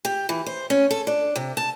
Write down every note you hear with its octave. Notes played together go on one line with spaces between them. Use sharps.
G4
E3
C5
C#4
A4
D4
C3
A5